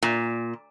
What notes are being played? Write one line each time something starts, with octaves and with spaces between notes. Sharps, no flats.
A#2